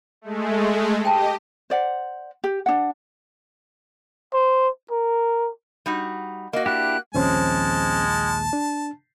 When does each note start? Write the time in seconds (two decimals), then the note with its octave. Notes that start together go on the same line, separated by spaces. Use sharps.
0.21 G#3 A3
1.05 G4 D#5 G5 A5
1.70 C5 D5 F#5
2.44 G4
2.66 D4 F#5
4.34 C5
4.91 A#4
5.86 G3 D#4 F#4
6.53 A#3 F#4 D#5
6.66 D4 E4 G4 F#6
7.15 A#1 D#2 F3 G#3 C4 C#4 C5 A5
8.53 D4